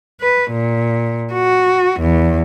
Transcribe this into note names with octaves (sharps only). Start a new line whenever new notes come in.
B4
A#2
F#4
E2